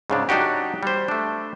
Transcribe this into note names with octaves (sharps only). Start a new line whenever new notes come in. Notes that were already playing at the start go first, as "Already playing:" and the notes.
G#2 C#3 D4
F#3 D4 D#4 F#4 G4
G3 C5
A3 D4